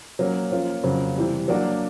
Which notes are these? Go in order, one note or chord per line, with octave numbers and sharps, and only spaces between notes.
F#3 A#3 C#4
F3 A#3 C#4 F4
F2 C#3 F#3 A#3
C3 E3 G3
F#3 A#3 D4 F#4